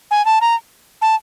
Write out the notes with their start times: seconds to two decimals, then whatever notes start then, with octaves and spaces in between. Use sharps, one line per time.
0.11 G#5
0.25 A5
0.41 A#5
1.02 A5